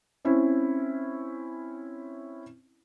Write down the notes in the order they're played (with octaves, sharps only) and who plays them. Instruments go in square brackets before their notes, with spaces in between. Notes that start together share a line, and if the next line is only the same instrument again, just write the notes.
[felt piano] C4 C#4 E4